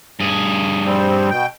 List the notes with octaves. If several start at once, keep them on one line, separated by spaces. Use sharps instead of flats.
G2 G#4
G3 C4
B2 G5